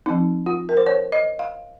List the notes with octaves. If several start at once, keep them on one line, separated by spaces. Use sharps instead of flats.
F3 C4 D#4
F4
A#4
C5
C#5
D#5
F5